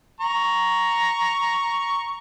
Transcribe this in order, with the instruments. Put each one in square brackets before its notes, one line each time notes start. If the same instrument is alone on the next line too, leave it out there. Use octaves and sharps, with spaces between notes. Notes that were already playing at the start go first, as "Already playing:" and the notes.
[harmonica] A#5 C#6